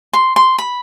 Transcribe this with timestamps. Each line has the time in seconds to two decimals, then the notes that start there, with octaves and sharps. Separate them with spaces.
0.13 C6
0.36 C6
0.58 B5